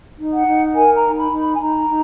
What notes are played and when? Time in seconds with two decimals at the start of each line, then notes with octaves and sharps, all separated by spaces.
0.17 D#4
0.31 F#5
0.46 D#4
0.74 A#4 G#5
0.95 A#5
1.03 D#4
1.16 B5
1.30 D#4
1.38 B5
1.53 G#5
1.59 D#4 A#5
1.88 D#4